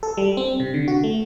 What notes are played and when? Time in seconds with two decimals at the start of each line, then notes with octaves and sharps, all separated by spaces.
0.03 A4
0.17 G3
0.37 C4
0.60 C3
0.74 D3
0.88 F#4
1.04 A3